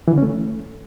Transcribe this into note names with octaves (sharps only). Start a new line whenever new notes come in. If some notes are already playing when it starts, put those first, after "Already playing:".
E3
D3
C#4
A3